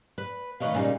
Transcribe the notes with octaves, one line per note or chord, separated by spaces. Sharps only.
B4
D#3 A3 B4 C#5 D#5 F5
A#2 C#3 G3 G#3 A#3 D#4